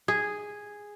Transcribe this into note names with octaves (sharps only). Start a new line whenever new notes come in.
G#4